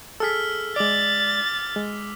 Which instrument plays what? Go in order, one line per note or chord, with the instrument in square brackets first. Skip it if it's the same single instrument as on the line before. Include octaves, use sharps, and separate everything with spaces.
[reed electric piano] G#4 A4 [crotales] E6 F6 B6
[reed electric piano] G#3 D5 [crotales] D6 F#7 [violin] A6
[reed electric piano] G#3